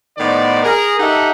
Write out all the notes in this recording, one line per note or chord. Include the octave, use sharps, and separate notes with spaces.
A2 D#3 B3 D#4 C5 D5
G#4 A#4
D#4 G4 A4 D#5 E5 F#5